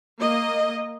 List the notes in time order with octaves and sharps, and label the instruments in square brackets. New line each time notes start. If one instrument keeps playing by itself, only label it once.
[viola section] A#3 D#5